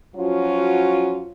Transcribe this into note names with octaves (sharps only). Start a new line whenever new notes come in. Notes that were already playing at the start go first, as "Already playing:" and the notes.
F3 F#3 C#4 F4 F#4